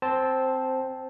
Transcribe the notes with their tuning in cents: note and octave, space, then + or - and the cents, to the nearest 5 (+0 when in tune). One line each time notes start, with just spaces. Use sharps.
C4 +0 C5 +10 A5 -10